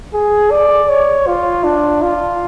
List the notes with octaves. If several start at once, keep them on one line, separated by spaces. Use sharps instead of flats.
G#4
D5
C#5
F4
D4
F4